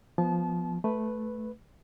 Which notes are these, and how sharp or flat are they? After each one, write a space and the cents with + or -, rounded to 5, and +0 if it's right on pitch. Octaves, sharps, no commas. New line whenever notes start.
F3 +0 B3 +0 A5 -30
A3 -10 B4 +0